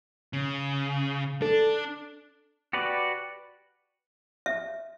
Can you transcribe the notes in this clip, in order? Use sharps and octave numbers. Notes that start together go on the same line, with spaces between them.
C#3
D4 A4
F#4 G4 B4 D5
E5